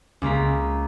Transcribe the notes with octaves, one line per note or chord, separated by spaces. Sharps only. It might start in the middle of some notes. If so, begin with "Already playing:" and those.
C#2 A#3 A#5 B6